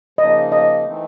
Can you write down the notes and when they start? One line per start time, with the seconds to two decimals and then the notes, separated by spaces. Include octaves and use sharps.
0.18 C#3 F3 A#3 D#4 D#5
0.52 D#5
0.85 E3 A3 C4 D#4